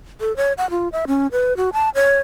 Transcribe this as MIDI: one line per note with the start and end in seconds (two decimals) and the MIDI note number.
0.21 0.35 69
0.37 0.53 73
0.58 0.69 78
0.70 0.89 65
0.92 1.05 76
1.07 1.27 61
1.32 1.56 71
1.57 1.69 66
1.73 1.89 81
1.95 2.20 73